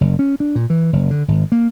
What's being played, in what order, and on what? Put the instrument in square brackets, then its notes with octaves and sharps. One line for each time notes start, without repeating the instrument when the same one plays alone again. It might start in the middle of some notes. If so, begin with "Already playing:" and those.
[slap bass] F#1
C#4
D4
A#2
E3
F#1
D3
G#1
A#3